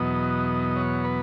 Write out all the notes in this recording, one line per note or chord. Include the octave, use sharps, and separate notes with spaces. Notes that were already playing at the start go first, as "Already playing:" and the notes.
Already playing: E2 B2 F#3 B3 D#5
C#5
B4